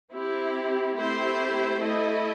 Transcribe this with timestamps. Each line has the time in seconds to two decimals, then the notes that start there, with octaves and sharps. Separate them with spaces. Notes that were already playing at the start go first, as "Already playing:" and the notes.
0.11 C4 E4 G4
0.95 A3 C4 E4 G4 C5
1.79 A3 E4 A4 D#5